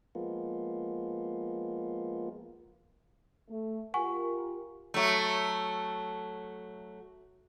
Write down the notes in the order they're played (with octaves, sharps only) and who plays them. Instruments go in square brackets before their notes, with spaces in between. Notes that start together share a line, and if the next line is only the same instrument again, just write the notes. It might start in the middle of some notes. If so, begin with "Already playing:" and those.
[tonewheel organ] F3 G#3 A#3 B3 F4
[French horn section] A3
[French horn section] F4 G4 A#4 [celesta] F#5 G#5 C#6
[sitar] F#3 A3